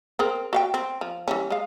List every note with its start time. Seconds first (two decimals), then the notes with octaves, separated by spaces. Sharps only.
0.19 C4 G#4 A#4
0.53 F#4 F5 G5
0.74 C4
1.01 F3
1.28 E3 G3 C#4
1.50 G#3 F5